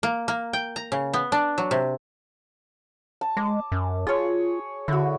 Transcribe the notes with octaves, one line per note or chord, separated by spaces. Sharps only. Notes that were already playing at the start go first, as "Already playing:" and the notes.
A#3
A#3
G5
A#5
C#3
B3
D4
F#3
C3
A5
G#3 D6
F#2
F4 G#4 C#5
D3 E4 F#4